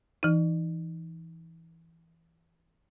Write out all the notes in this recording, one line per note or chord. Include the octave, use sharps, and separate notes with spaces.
E3 D#4